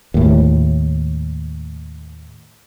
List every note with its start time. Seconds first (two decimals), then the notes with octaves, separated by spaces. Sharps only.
0.14 D#2 A2